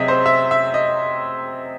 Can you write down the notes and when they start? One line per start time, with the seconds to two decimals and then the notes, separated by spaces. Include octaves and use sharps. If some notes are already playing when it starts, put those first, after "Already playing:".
Already playing: C3 F#3 C4 G#4 D#5 E5
0.08 C5
0.26 E5
0.51 E5
0.74 D#5